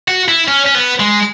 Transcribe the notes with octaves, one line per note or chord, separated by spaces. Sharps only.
F#4
E4
C#4
C#4
B3
G#3